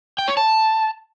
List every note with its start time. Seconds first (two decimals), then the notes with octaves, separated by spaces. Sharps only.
0.18 G5
0.28 C#5
0.37 A5